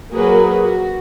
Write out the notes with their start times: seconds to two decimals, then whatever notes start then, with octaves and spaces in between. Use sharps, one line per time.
0.13 F#3 A#3 F#4 G#4 B4
0.62 F#4